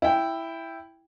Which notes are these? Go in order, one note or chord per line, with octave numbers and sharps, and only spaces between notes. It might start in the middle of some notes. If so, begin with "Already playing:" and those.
E4 G5